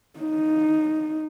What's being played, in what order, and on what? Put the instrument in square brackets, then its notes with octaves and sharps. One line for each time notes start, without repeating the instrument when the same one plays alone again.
[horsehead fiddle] D#4